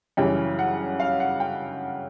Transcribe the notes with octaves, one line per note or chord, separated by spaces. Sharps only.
F#2 C#3 E3 G3 G5
F#5
F5
F#5
G5